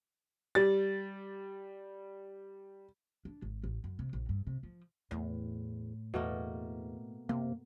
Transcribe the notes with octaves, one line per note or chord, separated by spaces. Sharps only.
G3 A6
D4
G#1
A1
F#2
C3
A#1
G2
C3
F3
E2 A2
E2 B2 A3 A#3
F#2 C3 A#3